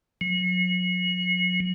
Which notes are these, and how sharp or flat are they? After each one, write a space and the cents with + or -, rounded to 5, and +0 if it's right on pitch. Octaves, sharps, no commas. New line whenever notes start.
F#3 -35